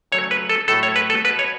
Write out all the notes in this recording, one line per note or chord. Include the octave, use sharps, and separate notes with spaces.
C#3 F#3 A3 C#5
B4
A4
A2 F#3 A3 A4
C#5
B4
A4
B2 B3 B4
C#5